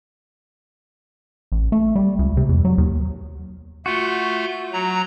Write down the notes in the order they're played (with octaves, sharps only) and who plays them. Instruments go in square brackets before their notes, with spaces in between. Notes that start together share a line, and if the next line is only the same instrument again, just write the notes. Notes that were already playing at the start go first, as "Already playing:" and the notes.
[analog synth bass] A1
A3
G3
C#2
C3
E2
F#3
D#2
[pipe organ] A3 F4 G6 [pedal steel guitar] F#4
[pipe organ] F#3 A#5